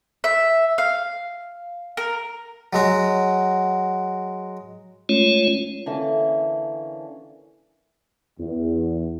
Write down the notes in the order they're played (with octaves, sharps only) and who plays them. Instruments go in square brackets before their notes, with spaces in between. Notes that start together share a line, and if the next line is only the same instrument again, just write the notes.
[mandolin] E5
F5
A#4
[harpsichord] F#3 G#3 F#4
[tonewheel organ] G#3 A3 C#4 F4 C#5
[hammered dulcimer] D3 E3 A#3 C#4
[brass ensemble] E2